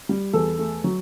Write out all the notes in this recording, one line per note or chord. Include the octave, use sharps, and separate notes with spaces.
G3
E2 A4
A3
F#3